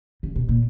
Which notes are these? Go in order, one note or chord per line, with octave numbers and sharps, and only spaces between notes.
C#3
B2
A#2